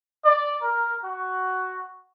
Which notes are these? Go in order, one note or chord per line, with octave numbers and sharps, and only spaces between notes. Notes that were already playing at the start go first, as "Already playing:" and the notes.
D5
A#4
F#4